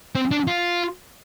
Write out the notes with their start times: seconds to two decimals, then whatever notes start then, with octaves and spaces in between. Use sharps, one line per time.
0.15 C4
0.31 D4
0.47 F4